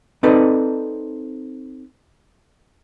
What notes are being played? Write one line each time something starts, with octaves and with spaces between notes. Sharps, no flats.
C4 D#4 A4 B4 D5